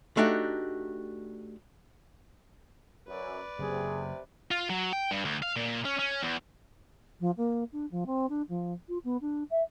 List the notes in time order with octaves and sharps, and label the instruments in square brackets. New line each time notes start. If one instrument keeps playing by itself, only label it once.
[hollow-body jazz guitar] A3 D4 D#4 F#4 G4
[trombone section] F#2 [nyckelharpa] B4 D5
[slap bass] F#1 [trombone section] C3 [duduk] G#4
[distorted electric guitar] F4
F#3
G5
G2
D2
F5
A#2
C#4
C#4
E2
[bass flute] F3
A#3
D4
F3
C4
D4
F3
F4
B3
D4
E5